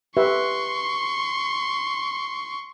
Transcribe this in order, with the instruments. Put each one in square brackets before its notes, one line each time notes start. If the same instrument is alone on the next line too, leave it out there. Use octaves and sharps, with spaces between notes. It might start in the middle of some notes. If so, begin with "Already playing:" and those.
[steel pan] G4 B4 E5 [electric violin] C6 C#6